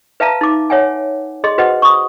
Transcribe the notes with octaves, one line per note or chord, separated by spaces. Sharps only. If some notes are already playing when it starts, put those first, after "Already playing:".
B4 E5 F5 A5 A#5
D#4 D6
C#5 E5 F#5 G#5
G#4 D#5 C6
F#4 B4 C5 D#5 F#5
C#6 D#6